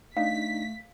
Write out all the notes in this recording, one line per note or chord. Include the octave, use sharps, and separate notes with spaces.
A3 D4 D#4 F5 B6